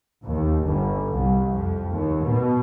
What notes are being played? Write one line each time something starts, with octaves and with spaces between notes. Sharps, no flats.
D#2
G1
C2
F2
D#2
B2